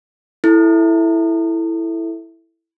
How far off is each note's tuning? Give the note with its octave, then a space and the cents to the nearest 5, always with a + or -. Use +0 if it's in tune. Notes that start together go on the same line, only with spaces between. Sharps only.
E4 +0 A4 +0 E5 +0